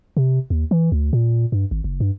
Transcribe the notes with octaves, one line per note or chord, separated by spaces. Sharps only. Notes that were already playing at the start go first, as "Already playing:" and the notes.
C3
D#2
E3
D2
A#2
G2
G#1
F#1
G2